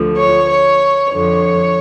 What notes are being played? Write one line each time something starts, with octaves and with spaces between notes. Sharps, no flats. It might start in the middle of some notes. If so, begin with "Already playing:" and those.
Already playing: D2 D3 F3
C#5
C#5
F2 D3 F3 C#5